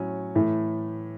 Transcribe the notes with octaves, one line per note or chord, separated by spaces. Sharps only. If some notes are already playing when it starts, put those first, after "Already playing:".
Already playing: A2 F#3 C#4
A2 E3 A3